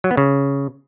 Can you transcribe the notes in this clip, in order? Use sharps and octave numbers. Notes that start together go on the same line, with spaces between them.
F#3
B3
C#3